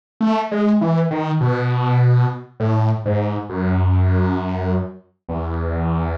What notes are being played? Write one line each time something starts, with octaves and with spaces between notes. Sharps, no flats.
A3
G#3
E3
D#3
B2
A2
G#2
F#2
E2